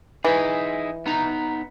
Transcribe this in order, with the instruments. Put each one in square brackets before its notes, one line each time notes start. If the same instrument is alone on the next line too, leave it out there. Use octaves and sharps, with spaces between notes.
[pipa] E3 [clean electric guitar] D#4 E4 G#4
[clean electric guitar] B3 D#4 A#5